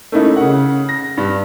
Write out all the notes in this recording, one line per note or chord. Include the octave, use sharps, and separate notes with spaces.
A3 A#3 C#4 D#4 E4
C#3 F#5
A#6
G2